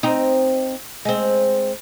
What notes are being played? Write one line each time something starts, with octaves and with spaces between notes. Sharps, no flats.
C4 D#4
G#3 C4